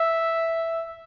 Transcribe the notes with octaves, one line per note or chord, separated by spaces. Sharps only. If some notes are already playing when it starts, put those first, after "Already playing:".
Already playing: E5